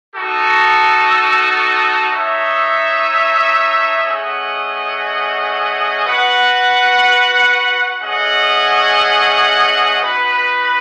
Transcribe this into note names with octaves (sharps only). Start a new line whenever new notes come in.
D#4 F#4 A4
D#4 A4 C#5 E5
A3 C#4 G#4 D#5 F#5
F#4 B4 F#5
A3 C#4 G#4 D#5 F#5
D#4 F#4 B4